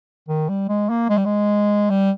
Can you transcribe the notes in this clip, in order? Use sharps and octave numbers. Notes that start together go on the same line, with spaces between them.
D#3
G3
G#3
A#3
G#3
G3
G#3
G3